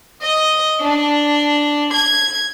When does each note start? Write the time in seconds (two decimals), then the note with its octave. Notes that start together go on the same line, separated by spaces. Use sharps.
0.22 D#5
0.81 D4
1.94 G#6